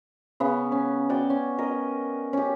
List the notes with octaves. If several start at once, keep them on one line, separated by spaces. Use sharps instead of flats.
C#3 B3
C#4
F#4 D5 G5
C#4
A#4 D#5
C#4 G4